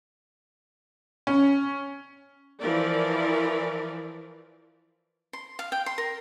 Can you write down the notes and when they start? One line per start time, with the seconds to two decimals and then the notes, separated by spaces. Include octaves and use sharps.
1.27 C#4
2.60 E3 F3 A#4 D5
5.33 C6
5.59 F5
5.72 G5
5.86 C6
5.98 A#4